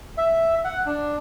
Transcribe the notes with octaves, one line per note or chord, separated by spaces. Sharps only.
E5
F#5
D4